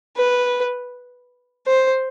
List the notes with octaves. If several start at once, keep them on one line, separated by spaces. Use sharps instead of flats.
B4
C5